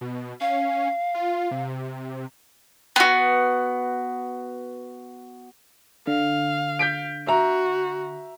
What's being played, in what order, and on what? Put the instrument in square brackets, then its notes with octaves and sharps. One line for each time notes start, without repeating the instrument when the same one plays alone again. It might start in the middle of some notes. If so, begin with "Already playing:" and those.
[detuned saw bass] B2
[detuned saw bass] C#4 [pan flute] F5
[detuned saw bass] F4
C3
[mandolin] B3 F#4
[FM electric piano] D3 [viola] F5
[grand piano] G6 B6 D7
[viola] F#4 [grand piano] E5 A#5